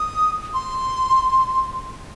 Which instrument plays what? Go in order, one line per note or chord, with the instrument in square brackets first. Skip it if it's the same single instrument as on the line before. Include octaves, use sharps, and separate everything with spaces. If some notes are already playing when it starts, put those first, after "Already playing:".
Already playing: [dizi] D#6
C6